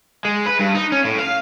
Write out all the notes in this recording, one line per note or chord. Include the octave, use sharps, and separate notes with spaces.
G#3
B4
G2
D#4
C#4
A2
F5